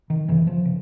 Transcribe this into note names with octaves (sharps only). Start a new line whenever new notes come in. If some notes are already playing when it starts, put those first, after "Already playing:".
D#3
F#2 C#3 E3
F3
C#3